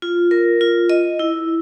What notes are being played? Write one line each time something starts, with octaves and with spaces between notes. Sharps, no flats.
F4
A#4
F4
D#5
E4